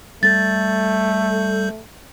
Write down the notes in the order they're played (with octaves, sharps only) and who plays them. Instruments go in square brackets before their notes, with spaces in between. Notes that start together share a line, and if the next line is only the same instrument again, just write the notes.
[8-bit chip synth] G3 A4 G6 [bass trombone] A3 [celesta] A6